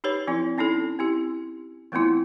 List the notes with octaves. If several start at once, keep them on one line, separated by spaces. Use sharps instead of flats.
D#4 G4 B4 C#5
F3 C4 E4 F4
C4 C#4 D#4 E4 A4
C4 E4 G4
E3 A3 B3 C4 E4 F4